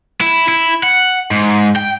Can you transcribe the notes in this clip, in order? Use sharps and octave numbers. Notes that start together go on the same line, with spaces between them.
E4
E4
F#5
G#2
G5